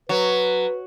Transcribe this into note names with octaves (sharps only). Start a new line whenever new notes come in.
F#3 B4